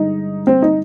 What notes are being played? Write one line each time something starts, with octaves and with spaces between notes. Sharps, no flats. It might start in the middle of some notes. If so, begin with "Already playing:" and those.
Already playing: G2 D3 G#3 D#4
C4
D#4